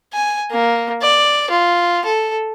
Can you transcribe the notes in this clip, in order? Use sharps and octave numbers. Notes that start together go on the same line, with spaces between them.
G#5
A#3
D5
F4
A4